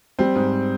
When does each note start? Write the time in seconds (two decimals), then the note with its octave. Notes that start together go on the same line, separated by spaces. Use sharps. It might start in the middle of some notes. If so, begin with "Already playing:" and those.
0.19 G3 C4
0.36 G#2